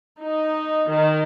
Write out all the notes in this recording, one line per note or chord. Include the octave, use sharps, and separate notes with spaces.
D#4
D#3